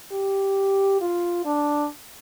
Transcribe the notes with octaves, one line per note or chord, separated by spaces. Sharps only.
G4
F4
D4